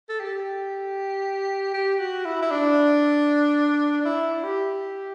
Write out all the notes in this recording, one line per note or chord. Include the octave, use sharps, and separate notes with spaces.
A4
G4
G4
F#4
E4
E4
D4
D4
E4
G4